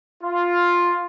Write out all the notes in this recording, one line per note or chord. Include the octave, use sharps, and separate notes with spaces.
F4